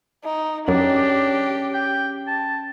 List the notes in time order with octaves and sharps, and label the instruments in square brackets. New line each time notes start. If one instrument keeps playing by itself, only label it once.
[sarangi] D#4
[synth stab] F#2 [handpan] C#4 [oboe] D4 [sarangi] G4
[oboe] G5
A5